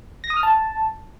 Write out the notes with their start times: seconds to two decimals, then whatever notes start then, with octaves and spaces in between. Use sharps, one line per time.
0.24 A#6
0.30 D#6
0.37 F6
0.43 A5